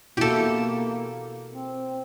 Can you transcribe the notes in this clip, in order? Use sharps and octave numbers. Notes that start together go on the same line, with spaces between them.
B2 A#3 E4 F#4 G4 A4
C4